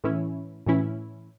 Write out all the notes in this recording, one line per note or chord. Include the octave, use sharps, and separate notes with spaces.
A2 E3 C#4 E4
A2 E3 C#4 E4